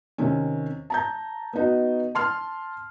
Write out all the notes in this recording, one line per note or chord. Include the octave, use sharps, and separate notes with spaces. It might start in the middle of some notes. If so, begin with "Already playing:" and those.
C3 D#3 C#4
A5 A#5 G6
B3 D#4 F#4
A5 C6 F6